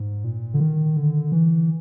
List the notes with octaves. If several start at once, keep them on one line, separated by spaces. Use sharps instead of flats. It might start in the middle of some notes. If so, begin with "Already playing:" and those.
Already playing: G#2
A#2
D3
D#3
D3
E3